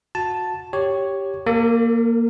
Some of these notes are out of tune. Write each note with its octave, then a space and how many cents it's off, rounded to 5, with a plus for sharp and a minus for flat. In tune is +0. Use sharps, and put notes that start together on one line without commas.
F#4 -20 A5 +0
G4 +0 C#5 +0
A#3 +0 A#4 -45